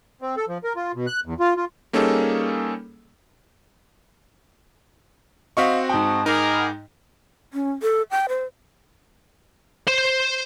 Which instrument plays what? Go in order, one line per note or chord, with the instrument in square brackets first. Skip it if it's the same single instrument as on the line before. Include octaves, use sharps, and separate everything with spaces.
[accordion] C4
A4
F3
A#4
F4
B2
F#6
E2
F4
F4
[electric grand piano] G3 A#3 C#4 D#4 G#4 A4
[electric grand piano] C4 F#4 C#6 [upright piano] D#5 F5 B6
[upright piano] G#2 G5 [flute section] A5 D#6
[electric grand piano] D#4 [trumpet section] G#4 A#4 [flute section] F#5 B5 D6
[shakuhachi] C#4
A4
G5
C5
[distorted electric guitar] C5 C6